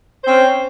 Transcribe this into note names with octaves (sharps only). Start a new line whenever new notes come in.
C4 C#4 C5